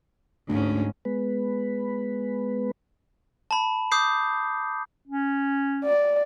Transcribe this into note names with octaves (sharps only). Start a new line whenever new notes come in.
D2 G#2 C#4
G#3 B3 B4
A5 B5
D6 D#6 G6 C7
C#4
D5